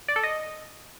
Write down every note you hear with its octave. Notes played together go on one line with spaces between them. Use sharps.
D5
A4
D#5